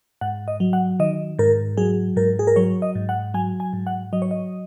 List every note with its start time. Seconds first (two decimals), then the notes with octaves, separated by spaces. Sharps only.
0.21 G#2 F#5
0.48 D#5
0.60 F#3
0.73 F#5
1.00 D#3 D#5
1.39 G#2 A#4
1.77 F#3 G#4
2.17 G#2 A#4
2.39 G#4
2.47 A#4
2.56 F#3 C#5
2.82 D#5
2.95 G#2
3.09 F#5
3.34 F#3 G#5
3.60 G#5
3.73 G#2
3.87 F#5
4.13 F#3 D#5
4.22 C#5
4.31 D#5